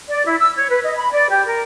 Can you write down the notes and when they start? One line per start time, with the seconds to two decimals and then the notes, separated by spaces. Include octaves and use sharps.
0.08 D5
0.26 E4
0.39 E6
0.55 C#5
0.70 B4
0.83 D#5
0.97 B5
1.12 D5
1.30 G4
1.44 A#4